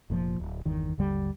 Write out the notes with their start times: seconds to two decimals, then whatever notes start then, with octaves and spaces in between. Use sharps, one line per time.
0.10 F1 A#2 C#3 F3
0.40 D1
0.65 G1 E2 D#3
0.98 G#1 D#2 D3 G3